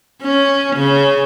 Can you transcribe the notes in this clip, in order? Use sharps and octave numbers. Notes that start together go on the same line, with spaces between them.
C#4
C#3